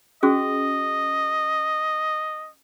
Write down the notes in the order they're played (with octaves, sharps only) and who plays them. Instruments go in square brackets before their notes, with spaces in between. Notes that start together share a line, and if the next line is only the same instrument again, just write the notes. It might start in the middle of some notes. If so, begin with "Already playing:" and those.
[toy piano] C#4 F#4 G#4 [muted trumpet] D#5